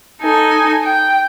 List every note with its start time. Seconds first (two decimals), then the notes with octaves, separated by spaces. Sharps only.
0.22 D#4 A4 G#5
0.82 G5